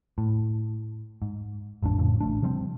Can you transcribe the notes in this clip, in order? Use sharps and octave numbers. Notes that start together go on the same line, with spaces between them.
A2
G#2
A1 F2 G#2 D4
F2 A2 C#3
A1 A3 D4
C3 F3 G3 C4